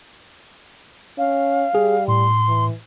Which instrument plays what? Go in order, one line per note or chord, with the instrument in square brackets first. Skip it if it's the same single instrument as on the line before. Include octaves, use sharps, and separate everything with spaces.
[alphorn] C#4 [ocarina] F5
[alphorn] G3 [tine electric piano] G#4
[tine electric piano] A2 [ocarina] C6
[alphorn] E3